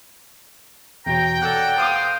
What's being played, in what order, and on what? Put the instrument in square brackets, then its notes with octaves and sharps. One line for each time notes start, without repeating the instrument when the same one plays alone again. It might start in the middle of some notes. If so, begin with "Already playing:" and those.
[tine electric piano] E2 B2 [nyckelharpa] C#5 [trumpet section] G5 [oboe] A#5
[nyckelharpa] A4 D5 [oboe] F#5 [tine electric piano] F#6
[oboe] C5 [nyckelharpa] F5 D#6